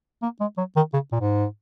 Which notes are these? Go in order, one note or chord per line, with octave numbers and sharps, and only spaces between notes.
A#3
G#3
F#3
D#3
C#3
A#2
G#2